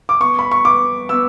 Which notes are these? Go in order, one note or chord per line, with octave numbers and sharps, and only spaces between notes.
D6
B3 C#6
B5
C#6
B3 D6
B3 E6